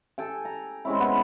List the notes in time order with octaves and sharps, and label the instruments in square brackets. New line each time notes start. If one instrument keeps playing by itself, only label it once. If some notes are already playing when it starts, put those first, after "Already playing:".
[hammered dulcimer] A4 G5 G#5
A#5
G#3 C4 C#4 E4
B3